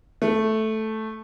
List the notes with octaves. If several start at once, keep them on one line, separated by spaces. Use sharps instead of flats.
A3